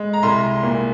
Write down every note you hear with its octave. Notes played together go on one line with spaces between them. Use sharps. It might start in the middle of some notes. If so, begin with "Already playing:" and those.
Already playing: G#3
A#5
C2 C6
A#2